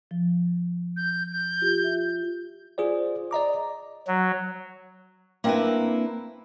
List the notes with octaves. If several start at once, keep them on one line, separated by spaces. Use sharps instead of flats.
F3
G6
G6
F4 G4
F4 E5
F4 G#4 C5 D5
D5 D#5 A#5 D6
F#3
A#3 C4 D4 E4 A#4 B4